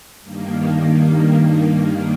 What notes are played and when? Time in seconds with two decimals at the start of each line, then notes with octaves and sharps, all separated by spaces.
0.22 G2 D#3 A#3
1.33 A#3